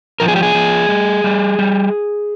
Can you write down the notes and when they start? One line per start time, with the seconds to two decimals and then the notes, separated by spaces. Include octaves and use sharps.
0.20 F3 A#4
0.28 G#4
0.36 G4
0.43 G#4
0.55 F3
0.89 G3
1.24 G3
1.59 G3